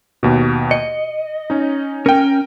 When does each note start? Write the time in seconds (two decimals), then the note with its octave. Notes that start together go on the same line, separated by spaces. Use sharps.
0.23 D#2 B2
0.71 D#5 C#7
1.50 C#4 D#4
2.06 C#4 A#4 G5